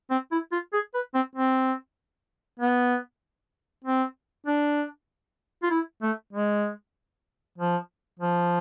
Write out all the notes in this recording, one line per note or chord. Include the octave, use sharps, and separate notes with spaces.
C4
E4
F4
G#4
B4
C4
C4
B3
C4
D4
F4
E4
A3
G#3
F3
F3